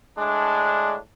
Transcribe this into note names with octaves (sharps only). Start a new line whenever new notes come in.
A2 G#3 D4